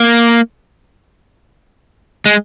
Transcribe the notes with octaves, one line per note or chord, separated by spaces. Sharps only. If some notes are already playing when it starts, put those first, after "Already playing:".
Already playing: A#3
G#3